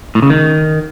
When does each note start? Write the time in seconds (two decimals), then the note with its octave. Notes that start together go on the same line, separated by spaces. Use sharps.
0.15 A2
0.22 C#3
0.30 D#3